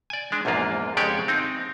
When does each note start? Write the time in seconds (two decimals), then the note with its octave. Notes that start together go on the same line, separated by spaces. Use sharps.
0.10 D5 G#5
0.32 G#3 D4
0.45 A#1 E2 G#2 A#3 F4
0.97 F2 C#3 G#3 G4 C#5 D5
1.28 C4 D#4